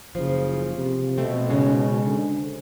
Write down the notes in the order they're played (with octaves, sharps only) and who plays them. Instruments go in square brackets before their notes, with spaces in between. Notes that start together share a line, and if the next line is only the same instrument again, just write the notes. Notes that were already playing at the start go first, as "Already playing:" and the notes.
[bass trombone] F#1 [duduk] C#3 [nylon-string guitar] F3 [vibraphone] C5
[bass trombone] C3
[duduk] B2 [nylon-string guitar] A3 C4
[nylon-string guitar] G#2 C#3 G#3 [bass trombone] C#4
[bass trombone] D3